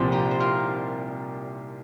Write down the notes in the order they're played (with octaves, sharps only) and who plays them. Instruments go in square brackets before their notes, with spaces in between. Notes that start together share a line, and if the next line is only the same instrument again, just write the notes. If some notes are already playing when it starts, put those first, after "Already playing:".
Already playing: [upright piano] C2 A#2 F3 [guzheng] G3 C4
[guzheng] D#4 G4
C5
F4 A#4